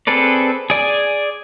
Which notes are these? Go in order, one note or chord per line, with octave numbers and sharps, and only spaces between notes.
C4 G#4 A4 B4 D5
G#4 D5 G#5